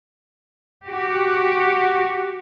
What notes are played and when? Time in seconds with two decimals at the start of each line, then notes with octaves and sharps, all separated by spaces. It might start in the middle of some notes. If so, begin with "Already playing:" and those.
0.86 F#4 G4